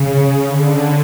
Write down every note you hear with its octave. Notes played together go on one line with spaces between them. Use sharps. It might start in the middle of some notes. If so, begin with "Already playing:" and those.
Already playing: C#3
D3